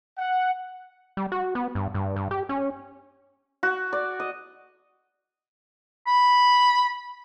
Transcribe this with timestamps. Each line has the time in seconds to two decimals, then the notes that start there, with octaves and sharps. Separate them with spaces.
0.18 F#5
1.17 G3
1.32 F#4
1.55 B3
1.75 G2
1.94 G2
2.16 G2
2.31 G4
2.49 C#4
3.63 F#4
3.93 D5
4.20 D#5
6.07 B5